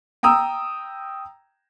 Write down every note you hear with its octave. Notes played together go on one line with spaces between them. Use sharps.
G5 A#5 D#6 E6